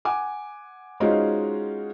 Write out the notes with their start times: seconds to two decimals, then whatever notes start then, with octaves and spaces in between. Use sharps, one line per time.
0.05 F#5 G#5 D6
1.00 G#3 C#4 D#4 F4 F#4 C5